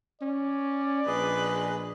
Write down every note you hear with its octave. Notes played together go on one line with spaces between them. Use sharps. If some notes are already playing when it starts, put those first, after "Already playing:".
C#4 D5
A#1 G#4 B4 D#5